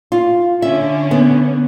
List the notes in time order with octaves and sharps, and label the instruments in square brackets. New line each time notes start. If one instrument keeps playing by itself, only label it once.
[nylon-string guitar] F4
[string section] D3 C#4 [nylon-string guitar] E5
[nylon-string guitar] B3